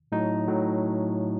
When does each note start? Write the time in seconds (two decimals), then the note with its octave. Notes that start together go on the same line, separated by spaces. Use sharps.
0.12 A2 F#3 D#4
0.48 A2 F#3